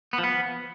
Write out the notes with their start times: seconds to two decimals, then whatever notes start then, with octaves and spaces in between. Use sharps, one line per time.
0.13 B3
0.18 F3
0.23 B3